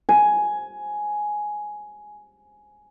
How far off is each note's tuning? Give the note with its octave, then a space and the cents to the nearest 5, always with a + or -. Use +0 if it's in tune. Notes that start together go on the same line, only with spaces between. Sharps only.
G#5 +10